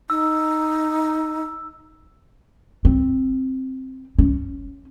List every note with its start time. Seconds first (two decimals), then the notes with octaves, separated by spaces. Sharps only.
0.10 D#4 E6
2.85 C4
4.19 C#4